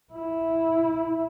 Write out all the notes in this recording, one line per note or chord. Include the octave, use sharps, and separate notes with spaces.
E4